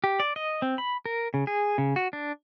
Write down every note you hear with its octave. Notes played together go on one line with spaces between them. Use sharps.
G4
D5
D#5
C4
B5
A#4
C#3
G#4
C#3
F#4
D4